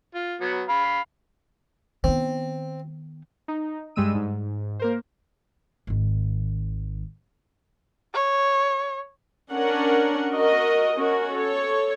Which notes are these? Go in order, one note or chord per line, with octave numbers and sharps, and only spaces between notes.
F4
F#3 B3
F5 B5
D#3 B3 C4
D#4
G2 G3 G#3 E6 D#7
G#2
A#3 A#4 C5
G#1 D#3
C#5
C#4 D4 A#4 F#5
F#4 A#4 D#5
C#4 F#4 A#4
A4 C#5